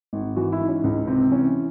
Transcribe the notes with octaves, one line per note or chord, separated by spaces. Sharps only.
G#1
E3 F#4
E4
G#2
C#4
C#2
C3 C4
E3 C#4